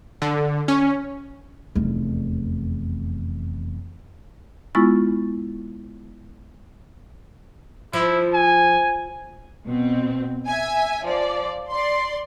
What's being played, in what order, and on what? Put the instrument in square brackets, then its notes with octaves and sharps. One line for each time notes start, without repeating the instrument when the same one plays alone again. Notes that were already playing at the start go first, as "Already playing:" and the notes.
[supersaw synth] D3
C#4
[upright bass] F1 E2
[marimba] G#3 B3 E4 F4 C#6 A6
[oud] F3 [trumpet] E4
[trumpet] G#5
[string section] B2 C4
E5 G#5
F3 D5
D5 C6